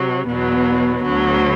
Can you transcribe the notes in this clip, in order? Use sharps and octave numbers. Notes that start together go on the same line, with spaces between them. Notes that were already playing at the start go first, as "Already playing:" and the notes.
Already playing: C3 F#3
E2 B2 F#3 B3
D2 D3 F#3